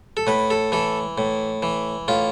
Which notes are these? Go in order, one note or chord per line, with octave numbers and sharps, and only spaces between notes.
A4
A2 B4
A4
E3 A4
A2
E3
A2 F4